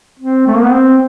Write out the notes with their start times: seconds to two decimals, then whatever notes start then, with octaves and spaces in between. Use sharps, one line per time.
0.19 C4
0.47 A3
0.55 A#3
0.63 B3
0.71 C4